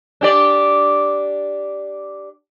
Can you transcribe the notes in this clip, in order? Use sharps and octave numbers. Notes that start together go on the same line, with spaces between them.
D4 G4 D5